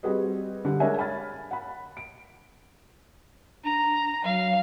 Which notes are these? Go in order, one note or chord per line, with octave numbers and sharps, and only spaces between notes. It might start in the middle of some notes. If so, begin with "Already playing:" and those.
G3 C4 F#4 G#4 B4 D#5
D3 G3
G#3 D4 A#4 C#5 E5 G#5
G#5 B5 F6 A6
F#5 B5
D7
D4 A#5
F#3 F5